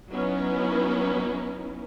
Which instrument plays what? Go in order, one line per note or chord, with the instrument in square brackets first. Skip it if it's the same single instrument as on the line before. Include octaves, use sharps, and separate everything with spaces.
[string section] F#3 B3 C#4 D#4 E4